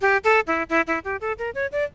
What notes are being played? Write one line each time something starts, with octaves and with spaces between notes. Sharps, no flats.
G4
A4
E4
E4
E4
G4
A4
A#4
C#5
D5